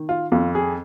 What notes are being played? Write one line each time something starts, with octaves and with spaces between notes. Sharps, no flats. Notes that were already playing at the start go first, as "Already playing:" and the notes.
Already playing: D#3
F4
F2 F4
G#4